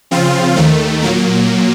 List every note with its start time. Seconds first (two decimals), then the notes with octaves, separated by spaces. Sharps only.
0.11 C#3 F3 C4 F4
0.56 D#2 D#3 A3
1.02 A#2 F#3 A#3